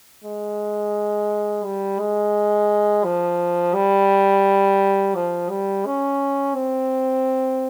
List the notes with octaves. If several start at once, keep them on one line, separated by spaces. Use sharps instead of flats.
G#3
G3
G#3
F3
G3
F3
G3
C#4
C4